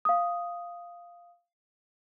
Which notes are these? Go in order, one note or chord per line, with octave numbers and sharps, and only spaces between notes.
F5 D#6